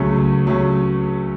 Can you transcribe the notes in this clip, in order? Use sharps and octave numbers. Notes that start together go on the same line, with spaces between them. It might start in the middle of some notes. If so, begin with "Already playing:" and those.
Already playing: C#2 C#3 F#3 A3 C#4
C#2
C#3 F#3 A3 C#4